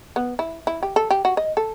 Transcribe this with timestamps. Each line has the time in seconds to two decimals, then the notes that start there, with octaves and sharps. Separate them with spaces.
0.16 B3
0.39 E4
0.67 E4
0.83 G4
0.96 A4
1.11 G4
1.25 F#4
1.37 D#5
1.57 A4